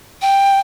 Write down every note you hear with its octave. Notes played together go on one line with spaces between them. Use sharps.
G5